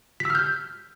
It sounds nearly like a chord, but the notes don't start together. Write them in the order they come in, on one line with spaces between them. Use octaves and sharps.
B6 E6 F6 G6